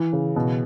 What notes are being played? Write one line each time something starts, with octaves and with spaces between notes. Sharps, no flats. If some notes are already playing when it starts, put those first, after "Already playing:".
Already playing: E3
C#3
B2